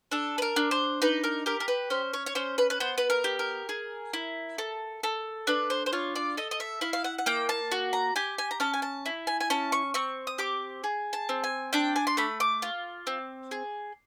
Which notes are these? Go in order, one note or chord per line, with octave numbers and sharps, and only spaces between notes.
D4 A4
B4
A#4
D4
C5
D#4 B4
A#4
G4 A#4
A#4
B4
C#4 C5
C#5
C#5
C#4 C5
B4
B4
B3 C5
B4
A#4
G4
A#4
G#4
E4
A4
A4
D4 B4
C5
C5
F4 C#5
D5
A4 D#5
D#5
E5
E4 F5
F5
F#5
F#5
A#3 G5
A5
F#4
A#5
G4 G#5
G#5
A#5
C#4 A5
G#5
A5
E4
G#5
G#5
C#4 A5
C#6
C4 C#6
D#6
G4 D6
G#4
A5
C4
G#5
D4 G5
G#5
C6
A3 B5
D6
F4
C4
G#4